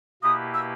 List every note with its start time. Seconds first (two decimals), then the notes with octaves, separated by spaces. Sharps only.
0.22 B2 A#3 E4 G4 B4 D#6
0.54 E6